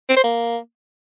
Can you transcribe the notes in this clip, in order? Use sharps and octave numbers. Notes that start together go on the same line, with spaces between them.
C4
C5
A#3